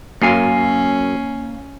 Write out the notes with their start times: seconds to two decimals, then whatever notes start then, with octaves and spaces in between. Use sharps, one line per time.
0.22 F#2 A#3 C#4 F5 G#5